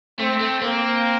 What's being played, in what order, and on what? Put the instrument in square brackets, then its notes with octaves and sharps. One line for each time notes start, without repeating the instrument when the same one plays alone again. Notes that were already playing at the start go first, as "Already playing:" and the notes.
[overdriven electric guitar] A3 [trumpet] C4
[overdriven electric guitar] A3
[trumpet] A#3 [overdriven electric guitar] C4